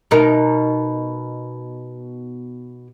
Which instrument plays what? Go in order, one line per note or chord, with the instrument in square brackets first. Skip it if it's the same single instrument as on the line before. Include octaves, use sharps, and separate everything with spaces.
[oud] B2 D#4 A#4